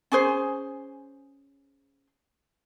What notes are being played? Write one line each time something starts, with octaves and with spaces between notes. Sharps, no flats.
C#4 G#4 C5